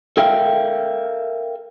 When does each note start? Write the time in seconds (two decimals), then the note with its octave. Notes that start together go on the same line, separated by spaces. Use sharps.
0.17 A4 A#4 E5 F5 G5